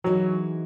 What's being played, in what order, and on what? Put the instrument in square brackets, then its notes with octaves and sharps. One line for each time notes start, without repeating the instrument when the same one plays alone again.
[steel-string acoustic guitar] E3 G#3 D#4 F#4 A#4 [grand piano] F#3